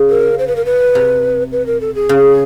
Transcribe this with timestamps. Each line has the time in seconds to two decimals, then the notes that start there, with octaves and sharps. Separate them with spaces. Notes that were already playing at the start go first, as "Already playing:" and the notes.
Already playing: C#3
0.10 A#4
0.39 C5
0.47 B4
0.56 A#4
0.65 B4
0.95 C3
1.52 B4
1.66 A#4
1.81 A4
1.95 G#4
2.09 C#3